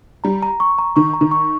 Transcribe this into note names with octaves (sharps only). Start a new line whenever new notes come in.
G3 A#5
A#5
C#6
A#5
D#3 C#6
A#5
D#3
C#6